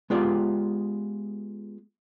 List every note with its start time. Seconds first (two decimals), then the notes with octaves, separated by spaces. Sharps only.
0.10 G#3 B3 F4 G4 D5